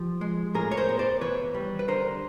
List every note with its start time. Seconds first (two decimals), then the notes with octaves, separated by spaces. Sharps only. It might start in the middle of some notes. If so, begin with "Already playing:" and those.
Already playing: F3 G4
0.21 G#3
0.55 A2 G#4 A#4
0.71 C#5
0.77 A#4 C5
0.89 B3
0.99 C5 D5
1.21 E3 B4 C#5
1.55 G3
1.79 B4
1.88 D3 A#4 C5